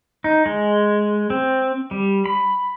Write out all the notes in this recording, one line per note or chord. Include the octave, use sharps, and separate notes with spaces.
D#4
G#3
C4
G3
B5